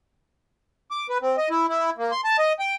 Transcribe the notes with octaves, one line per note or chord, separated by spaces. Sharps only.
D6
B4
C4
D#5
E4
E4
A#3
C6
A5
D#5
G5